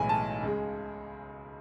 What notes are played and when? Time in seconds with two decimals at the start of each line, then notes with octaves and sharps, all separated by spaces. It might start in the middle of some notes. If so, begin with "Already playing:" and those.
Already playing: B1 A2 E3 G#3 G#5
0.09 A5
0.42 C#2 C#3 G#3